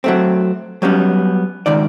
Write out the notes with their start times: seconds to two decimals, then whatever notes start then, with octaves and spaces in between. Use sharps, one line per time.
0.04 F#3 A3 C4
0.82 F#3 G3 B3 C#4
1.66 C#2 G#2 D#3 D5